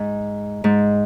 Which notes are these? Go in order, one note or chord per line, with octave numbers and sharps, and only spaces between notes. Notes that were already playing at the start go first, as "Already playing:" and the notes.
Already playing: G#2
G#2